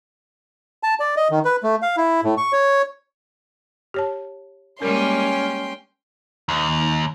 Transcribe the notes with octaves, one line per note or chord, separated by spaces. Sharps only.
A5
D5
D#5
D#3
B4
A3
F5
E4
A2
C#6
C#5
G4 C#5 A5
G3 G#3 A#3 C#4 A#4 G5 C6
D#2